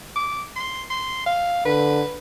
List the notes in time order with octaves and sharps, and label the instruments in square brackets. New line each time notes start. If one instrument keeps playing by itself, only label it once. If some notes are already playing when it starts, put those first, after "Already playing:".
[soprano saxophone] D6
C6
C6
F5
[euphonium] D3 [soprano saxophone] B4